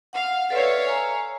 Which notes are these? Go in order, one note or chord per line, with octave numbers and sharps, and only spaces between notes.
F5 F#5
A4 B4 C#5 D5 E5 F5
G#5 A#5